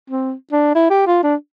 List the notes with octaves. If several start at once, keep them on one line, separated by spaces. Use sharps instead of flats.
C4
D4
E4
G4
F4
D4